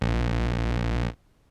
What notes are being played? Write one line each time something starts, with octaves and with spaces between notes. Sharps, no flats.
A#1